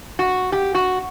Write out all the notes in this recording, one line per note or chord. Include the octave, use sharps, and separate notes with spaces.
F#4
G4
F#4